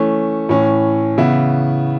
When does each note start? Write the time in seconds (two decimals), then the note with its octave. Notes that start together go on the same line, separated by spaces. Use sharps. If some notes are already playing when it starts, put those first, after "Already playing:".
Already playing: E3 A3 C#4
0.49 A2 E3 C#4
1.18 C#3 E3 B3 E4